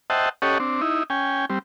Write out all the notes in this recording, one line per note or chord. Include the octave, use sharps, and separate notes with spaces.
C5 D#5 E5 F#5 G5 A5
C#4 G4 A4 C#5 D#5 F#5
C4 D4
D#4 E4
C#4 G5 G#5
G3 C4